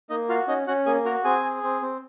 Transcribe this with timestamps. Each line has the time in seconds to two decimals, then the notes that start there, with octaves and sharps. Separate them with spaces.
0.10 A#3 D#4 D#5
0.29 F4 F#4 F5
0.48 C#4 D#4 D#5
0.67 C#4 F#4 F#5
0.86 A#3 G#4 G#5
1.05 F#4 A#4 A#5
1.24 C4 G#4 G#5
1.44 G#4
1.63 C4
1.82 C4